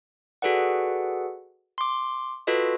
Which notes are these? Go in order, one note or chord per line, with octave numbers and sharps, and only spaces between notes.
F#4 G#4 A4 B4 D5 F#5
C6 D6
F4 F#4 A4 B4 D#5